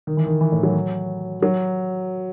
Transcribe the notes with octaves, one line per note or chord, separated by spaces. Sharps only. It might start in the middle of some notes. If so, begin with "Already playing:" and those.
D#3
E3
D#3
E3
A2
F#3
F#3